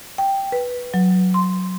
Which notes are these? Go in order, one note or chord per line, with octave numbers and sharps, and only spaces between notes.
G5
B4
F#3
C6